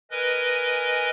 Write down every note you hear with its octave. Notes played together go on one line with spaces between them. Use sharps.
A#4 B4 D#5 G#5